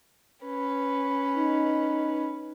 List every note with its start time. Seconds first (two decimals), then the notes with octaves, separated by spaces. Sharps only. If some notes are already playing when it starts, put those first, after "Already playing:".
0.44 C#4 B4
1.36 D#4